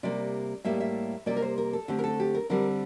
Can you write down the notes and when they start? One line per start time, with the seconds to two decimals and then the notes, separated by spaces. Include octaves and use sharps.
0.03 C3 G3 A#3 D5
0.65 A2 G3 A#3 E5
0.80 E5
1.26 C3 G3 A#3 D5
1.36 A#4
1.42 C5
1.58 A#4
1.73 A4
1.88 D3 A3 C4 G4
1.99 A#4
2.04 A4
2.20 G4
2.35 A#4
2.50 D3 G3 C4 A#4